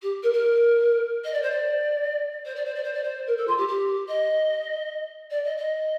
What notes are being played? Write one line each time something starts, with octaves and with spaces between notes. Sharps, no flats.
G4
A#4
A#4
D#5
D5
C5
D5
C5
D5
C5
D5
C5
D5
C5
A#4
A4
F4
G4
G4
D#5
D5
D#5
D#5